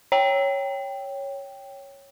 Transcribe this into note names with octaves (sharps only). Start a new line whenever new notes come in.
C#5 G5